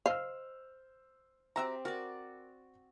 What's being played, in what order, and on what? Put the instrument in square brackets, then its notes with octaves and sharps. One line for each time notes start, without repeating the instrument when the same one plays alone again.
[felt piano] C5 E6 F6 [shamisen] D#5 F5
[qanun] C4 G4 [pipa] F#4 E5 A#5
[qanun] F#4 D5 [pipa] A#4